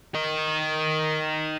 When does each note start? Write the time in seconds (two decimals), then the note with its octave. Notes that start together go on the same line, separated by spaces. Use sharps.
0.15 A#4 D#5